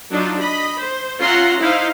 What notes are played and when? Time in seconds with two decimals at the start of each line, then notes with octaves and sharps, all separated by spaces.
0.11 F#3 D4 D#4 F4
0.39 D#5 B5
0.77 C5
1.21 C#4 F4 E5 F#5 A#5 C6
1.59 D#4 E4 C5 F5